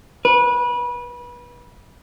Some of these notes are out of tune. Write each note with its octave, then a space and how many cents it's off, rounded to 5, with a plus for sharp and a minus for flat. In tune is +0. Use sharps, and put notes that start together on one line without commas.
B4 -25